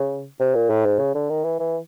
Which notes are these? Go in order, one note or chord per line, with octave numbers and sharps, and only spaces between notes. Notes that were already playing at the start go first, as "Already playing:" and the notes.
Already playing: C#3
C3
A#2
A2
G#2
C#3
D3
D#3
E3
E3